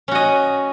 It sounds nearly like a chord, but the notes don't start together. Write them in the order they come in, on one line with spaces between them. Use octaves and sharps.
C#4 F#4 D#5